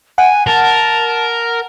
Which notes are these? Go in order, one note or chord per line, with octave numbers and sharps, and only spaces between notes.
F#5 G#5
A#4 A5